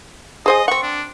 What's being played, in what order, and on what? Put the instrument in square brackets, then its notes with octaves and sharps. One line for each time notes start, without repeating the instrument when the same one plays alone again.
[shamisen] G#4 C5 G#5 [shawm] D#5
[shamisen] C4 F#5 [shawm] C#6
[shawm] D4